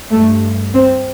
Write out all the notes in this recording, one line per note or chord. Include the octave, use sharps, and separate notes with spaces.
G2 A3
C4